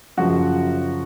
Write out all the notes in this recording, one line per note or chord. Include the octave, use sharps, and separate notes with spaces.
F#2 C#3 F3 F#4